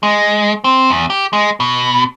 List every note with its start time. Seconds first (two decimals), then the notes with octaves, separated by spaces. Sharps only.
0.03 G#3
0.64 C4
0.90 E2
1.10 G4
1.33 G#3
1.60 B2